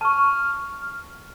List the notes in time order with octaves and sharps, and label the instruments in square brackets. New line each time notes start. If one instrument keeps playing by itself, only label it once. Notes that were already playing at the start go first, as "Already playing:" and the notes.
[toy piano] A5 C#6 [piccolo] F6